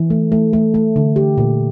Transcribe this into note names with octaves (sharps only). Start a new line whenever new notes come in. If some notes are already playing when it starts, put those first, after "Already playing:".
Already playing: E3
A3
A3
A3
A3
D3
G4
A#2